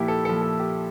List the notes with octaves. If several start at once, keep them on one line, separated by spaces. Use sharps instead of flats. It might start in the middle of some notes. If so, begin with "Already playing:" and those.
Already playing: A#2 F3 E4 G4
A4
A#2 F3 A4
A4
G4